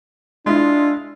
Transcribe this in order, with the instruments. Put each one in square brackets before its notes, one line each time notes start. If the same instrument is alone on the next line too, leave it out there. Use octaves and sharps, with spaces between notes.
[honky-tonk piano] G#3 E4 [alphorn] D4 [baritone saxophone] F4